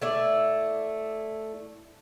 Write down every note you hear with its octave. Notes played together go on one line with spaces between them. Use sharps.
A3 E4 D5